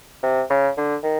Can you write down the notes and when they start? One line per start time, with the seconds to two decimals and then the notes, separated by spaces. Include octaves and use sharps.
0.23 C3
0.50 C#3
0.77 D3
1.03 D#3